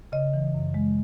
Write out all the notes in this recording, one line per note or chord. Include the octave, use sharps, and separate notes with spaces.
C#3 D#5
E3
F#2
G#3